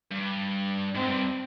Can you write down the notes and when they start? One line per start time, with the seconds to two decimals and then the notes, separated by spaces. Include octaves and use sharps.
0.11 G2
0.95 G#2 C4
1.08 G2